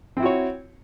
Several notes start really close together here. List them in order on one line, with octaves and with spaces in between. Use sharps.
C4 E4 F#4 C#5